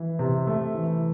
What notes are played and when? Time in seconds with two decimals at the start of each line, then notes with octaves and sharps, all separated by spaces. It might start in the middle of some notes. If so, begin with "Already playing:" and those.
Already playing: E3
0.19 C3
0.47 A3
0.74 E3